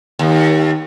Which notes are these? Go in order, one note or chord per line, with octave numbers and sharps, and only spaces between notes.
D#2